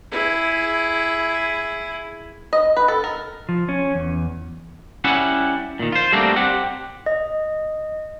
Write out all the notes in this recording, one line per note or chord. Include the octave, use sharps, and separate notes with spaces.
E4 G#4
D#5
B4
A4
A#4
F3
C#4
E2
G3 C#4 E4 E5 F#5
A#2 D#3
F4 C5
G3 A3 A#3 C4 D4 F#4
C4 G4 F#5
D#5